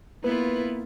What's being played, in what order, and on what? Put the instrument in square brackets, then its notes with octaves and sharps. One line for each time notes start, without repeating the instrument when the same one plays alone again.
[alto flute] A#3 [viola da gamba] B3 F4 [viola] E4 [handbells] B4